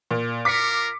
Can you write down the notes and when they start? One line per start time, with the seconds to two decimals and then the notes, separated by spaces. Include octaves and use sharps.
0.11 A#2
0.45 F4 A#4 D6 B6 C#7